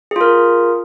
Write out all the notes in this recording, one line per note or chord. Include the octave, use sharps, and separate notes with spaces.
F4 G#4 A#4